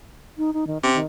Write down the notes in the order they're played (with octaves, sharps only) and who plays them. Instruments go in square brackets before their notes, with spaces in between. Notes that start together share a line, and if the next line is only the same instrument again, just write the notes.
[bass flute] D#4
D#4
D#3
[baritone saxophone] C3 [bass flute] C#4
[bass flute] D#3